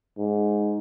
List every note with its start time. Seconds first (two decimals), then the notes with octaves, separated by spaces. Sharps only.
0.18 G#2